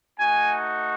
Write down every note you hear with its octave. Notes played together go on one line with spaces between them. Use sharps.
A3 D#4 F#4 G#5